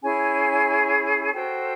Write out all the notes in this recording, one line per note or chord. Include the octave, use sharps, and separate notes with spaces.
C#4 E4 G#4 G#5
F#4 A4 C5 G5